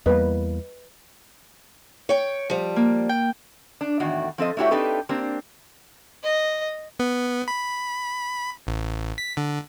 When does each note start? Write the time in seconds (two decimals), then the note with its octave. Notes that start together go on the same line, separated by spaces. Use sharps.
0.06 E2 G3 A#3 B4 D#5
2.09 C#5 G5
2.50 F3 G3
2.76 A#3
3.09 G5
3.81 D4
4.00 E2 A2 D#3 F#4
4.38 F3 C4 A4 D#5
4.57 A3 D4 E4 F#4 G4 C#5
4.71 C4 D4 D#4 G4 A4 B4
5.09 A#3 C4 D4 G4
6.23 D#5
7.00 B3
7.48 B5
8.67 A1
9.18 B6
9.37 D3